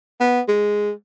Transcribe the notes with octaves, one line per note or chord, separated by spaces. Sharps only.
B3
G#3